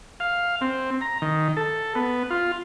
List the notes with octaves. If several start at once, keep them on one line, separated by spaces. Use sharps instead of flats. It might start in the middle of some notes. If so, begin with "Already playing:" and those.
F5
C4
A#5
D#3
A4
B3
F4